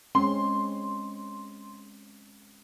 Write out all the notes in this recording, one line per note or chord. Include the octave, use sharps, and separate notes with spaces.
G#3 C4 C#4 C6